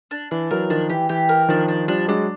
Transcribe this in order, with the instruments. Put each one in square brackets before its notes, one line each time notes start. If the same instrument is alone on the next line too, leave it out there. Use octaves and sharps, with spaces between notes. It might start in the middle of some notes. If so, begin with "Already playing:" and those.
[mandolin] D4
[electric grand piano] E3 [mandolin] D4
[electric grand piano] E3 F#3 [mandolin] A#4
[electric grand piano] D#3 F3 [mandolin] D4
[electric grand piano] E3 [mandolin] G4
[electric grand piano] E3 [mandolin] G4
[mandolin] A#4
[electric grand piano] D#3 F3 [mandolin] D4
[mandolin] D4
[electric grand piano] F3 G3 [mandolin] D4
[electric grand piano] F#3 G#3 [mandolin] D4